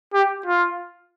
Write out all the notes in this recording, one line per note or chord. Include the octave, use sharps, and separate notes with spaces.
G4
F4